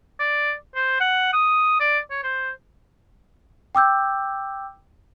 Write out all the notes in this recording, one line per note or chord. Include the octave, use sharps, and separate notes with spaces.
D5
C5
F#5
D#6
D5
C#5
C5
G5 D6 E6 G6